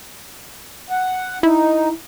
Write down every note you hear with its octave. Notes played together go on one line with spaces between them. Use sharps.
F#5
D#4 E4